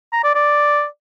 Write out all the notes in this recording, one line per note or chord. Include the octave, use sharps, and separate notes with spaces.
A#5
D5
D5